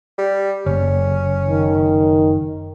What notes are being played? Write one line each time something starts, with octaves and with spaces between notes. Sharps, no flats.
G3
F#1 C#4
D#3